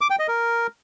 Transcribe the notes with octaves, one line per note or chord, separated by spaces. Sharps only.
D6
G5
D#5
A#4